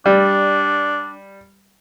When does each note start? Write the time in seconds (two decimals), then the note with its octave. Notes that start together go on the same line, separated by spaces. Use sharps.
0.06 G3 D4